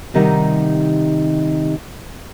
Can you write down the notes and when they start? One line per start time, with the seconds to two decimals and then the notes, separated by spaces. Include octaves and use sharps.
0.14 C3 D#3 G3 D#4 F#5